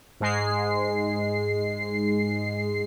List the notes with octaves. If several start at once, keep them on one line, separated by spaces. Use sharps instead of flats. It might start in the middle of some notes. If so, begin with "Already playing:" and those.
G#2 G#3 C7